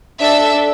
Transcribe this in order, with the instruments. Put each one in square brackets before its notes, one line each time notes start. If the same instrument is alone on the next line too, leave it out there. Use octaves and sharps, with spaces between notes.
[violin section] D4 A4 E5